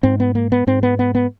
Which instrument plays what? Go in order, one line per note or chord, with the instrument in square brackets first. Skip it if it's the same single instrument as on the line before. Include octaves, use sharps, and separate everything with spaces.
[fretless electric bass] G#2 C4
B3
A#3
B3
G#2 C4
B3
B3
B3